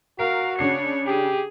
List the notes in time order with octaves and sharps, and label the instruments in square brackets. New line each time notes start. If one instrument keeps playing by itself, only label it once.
[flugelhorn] F#4 [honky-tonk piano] A#4 [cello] F5
[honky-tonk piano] C#3 D4 C7 [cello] C#5
[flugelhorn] G4 [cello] G#4